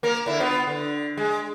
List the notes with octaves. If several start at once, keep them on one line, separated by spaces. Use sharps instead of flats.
A#3 A#4
D3 E4
B3 F4
D3
G#3